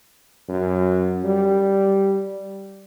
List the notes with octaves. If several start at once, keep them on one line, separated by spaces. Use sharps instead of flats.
F#2
G3